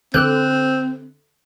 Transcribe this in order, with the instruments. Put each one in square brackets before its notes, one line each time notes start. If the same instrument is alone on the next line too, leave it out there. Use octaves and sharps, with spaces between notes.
[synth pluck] D3 F#6 [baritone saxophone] C4